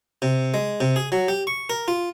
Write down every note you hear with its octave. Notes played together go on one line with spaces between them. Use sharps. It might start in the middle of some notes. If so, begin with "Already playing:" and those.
C3
G#3
C3
G#4
F#3
G4
C#6
A#4
F4